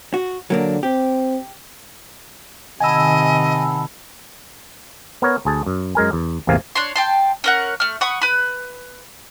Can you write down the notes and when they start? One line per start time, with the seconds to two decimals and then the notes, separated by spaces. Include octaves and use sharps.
0.14 F#4
0.50 D3 F#3 A#3 D4
0.83 C4 G4
2.80 C3 D#3 D#5 F#5 G#5 A5 B5 E6
5.22 B3 A#4 C#5
5.45 D2 G#4 A5
5.66 F#2
5.95 F#2 G#3 A#4 G#5
6.13 E2
6.47 A1 E2 C3 A#3 F5 G#5
6.75 D4 C#5 C6
6.96 G5 A5 C6
7.44 C#4 A#4 F#5
7.80 A3 F6
8.01 F#5 B5 C#6 D#6
8.22 B4 B5